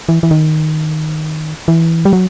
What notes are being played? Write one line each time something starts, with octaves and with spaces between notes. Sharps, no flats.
E3
E3
D#3
E3
G3
F#3